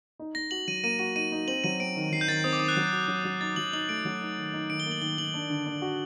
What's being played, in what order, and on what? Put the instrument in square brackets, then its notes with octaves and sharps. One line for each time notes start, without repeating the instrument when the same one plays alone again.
[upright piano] D#4
[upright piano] D#4 [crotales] A#6
[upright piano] F#4 [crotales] F#7
[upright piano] F#3 [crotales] D#7
[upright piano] A#3 [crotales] D#7
[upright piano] F#4 [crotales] D#7
[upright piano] D#4 [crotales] D#7
[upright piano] D#4
[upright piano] C4 [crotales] F#7
[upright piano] F#3 [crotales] D#7
[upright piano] C4 [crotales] D7
[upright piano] D#3
[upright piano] F#3 [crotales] C7
[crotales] G6
[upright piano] D#3 [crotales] A6
[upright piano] C4 [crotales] D#6
[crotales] D6
[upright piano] D#3 [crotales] D#6
[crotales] F#6
[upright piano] F#3
F#4
F#3
F#3
[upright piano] D#4 [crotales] A6
[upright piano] F#3 [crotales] F#7
[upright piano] D#4 [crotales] F#7
[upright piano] A3 [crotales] D7
[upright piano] F#3
D#4
D#3
D#4
[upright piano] D#3 [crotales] D7
[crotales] G7
[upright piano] A#3
[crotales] F#7
[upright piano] D#3 [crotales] G7
[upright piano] D#3 [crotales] F#7
[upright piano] D4
D3
D4
F#4